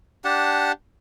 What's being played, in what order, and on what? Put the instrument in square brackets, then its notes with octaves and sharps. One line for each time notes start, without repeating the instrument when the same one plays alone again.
[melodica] D4 G4 F#5 A5